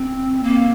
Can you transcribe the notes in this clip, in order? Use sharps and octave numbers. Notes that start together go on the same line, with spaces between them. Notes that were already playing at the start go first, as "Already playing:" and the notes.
Already playing: C4
A#3